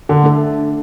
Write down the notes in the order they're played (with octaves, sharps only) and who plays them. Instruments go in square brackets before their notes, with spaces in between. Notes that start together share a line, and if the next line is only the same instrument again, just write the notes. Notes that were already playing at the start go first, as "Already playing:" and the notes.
[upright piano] D3
[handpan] A3 D4 A4